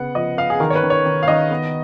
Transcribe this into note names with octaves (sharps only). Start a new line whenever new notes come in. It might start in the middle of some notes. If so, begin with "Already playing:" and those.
Already playing: C#3 B3 F#5
F3 D#5
B3 F5
G#4
D#3 A#4
C#5
B4
D#3
C#5
D#3
F5
D#3 D#5
B3